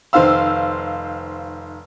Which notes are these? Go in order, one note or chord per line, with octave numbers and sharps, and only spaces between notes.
F1 D#3 C5 F5 E6